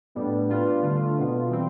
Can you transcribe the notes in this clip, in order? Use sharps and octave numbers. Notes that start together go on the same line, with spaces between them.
A2 G3 B3 D4
G3 D4 F4 B4
D3 A3 D4 F4
B2 B3 F4
E3 G3 C4